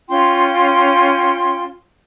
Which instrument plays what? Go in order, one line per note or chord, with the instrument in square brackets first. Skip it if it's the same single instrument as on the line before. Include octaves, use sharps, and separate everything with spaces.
[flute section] C#4 F4 G5 C6